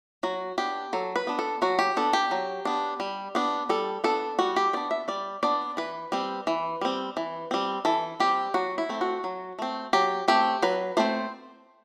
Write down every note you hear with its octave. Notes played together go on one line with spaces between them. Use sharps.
F#3 F#4
B3 D4 G4
F#3 A4
B4
B3 D4
A4
F#3 F#4
G4
B3 D4 A4
G4
F#3
B3 D4
G3
B3 D4
G3 A4
B3 D4 A4
G3 F#4
G4
B3 D4 D5
E5
G3 D5
B3 D4 D5
E3 B4
G3 C4
E3
G3 C4
E3
G3 C4
E3 A4
G3 C4 G4
F#3 F#4
E4
A3 C4
F#4
F#3
A3 C4
F#3 G4
A3 C4 G4
F#3 B4
A3 C4 C5